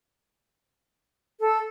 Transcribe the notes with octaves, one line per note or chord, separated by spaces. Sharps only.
A4